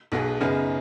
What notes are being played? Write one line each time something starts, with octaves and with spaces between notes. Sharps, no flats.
B1 B2 B3 G#4 B4
F#2 C#3 B3 D#4 G#4